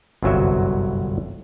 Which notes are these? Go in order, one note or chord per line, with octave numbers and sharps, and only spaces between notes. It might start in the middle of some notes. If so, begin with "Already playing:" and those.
G1 C2 F#2 F#3 F#4 E5